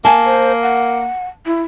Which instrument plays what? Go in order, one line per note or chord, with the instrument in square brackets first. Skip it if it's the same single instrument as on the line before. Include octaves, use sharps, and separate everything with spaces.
[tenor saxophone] A#3 [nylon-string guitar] G#5 A5
[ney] C5
F#5
E4